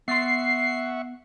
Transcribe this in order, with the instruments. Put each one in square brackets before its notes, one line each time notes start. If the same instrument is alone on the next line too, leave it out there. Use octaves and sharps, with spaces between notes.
[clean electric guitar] B3 C6 [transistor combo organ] E5 F#5 C#6 [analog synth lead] C7